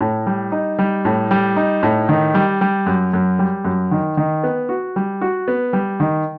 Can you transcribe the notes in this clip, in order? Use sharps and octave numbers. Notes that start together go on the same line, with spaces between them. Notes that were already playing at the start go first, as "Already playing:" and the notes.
A2
G3
D#4
G3
A2
G3
D#4
A2
D#3
G3
G3
F#2
F#2
G3
F#2
D#3
D#3
B3
F#4
G3
F#4
B3
G3
D#3